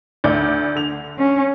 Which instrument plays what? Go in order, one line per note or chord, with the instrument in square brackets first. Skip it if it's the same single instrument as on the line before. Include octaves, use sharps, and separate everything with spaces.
[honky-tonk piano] D2 D5 G6
D3 F7
[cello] C#4